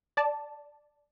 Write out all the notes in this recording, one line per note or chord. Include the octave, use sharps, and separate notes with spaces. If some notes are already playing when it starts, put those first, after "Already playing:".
D5 A5